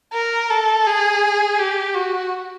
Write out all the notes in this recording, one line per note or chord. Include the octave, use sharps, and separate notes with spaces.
A#4
A4
G#4
G4
F#4